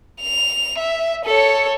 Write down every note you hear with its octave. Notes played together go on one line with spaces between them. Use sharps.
F7
E5
A4 C#5